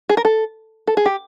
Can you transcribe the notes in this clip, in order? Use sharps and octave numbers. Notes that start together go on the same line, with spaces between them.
G#4
A#4
A4
A4
G#4
G4